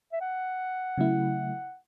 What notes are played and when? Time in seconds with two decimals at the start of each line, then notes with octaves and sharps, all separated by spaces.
0.13 E5
0.21 F#5
0.98 C#3 F#3 A3 E4